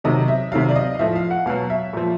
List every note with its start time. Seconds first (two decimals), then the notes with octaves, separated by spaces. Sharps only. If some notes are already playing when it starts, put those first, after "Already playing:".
0.04 C3 D#3 F#3 D#5
0.28 E5
0.52 C3 D#3 F#3 F5
0.68 D5
0.76 D#5
0.94 F5
0.99 A2 F3 E5
1.16 F5
1.31 F#5
1.46 B2 F#3 F5
1.70 E5
1.93 A#2 F3